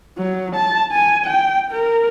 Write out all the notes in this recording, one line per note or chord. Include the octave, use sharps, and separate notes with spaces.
F#3
A5
G#5
G5
A#4